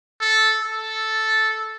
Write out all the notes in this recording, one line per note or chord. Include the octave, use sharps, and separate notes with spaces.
A4
A4